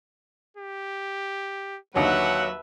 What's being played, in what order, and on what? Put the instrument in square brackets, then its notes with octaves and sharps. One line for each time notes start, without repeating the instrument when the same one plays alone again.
[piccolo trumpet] G4
[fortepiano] D#2 D3 D#4 [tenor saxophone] F#3 [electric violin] B4 E5 [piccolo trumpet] F#5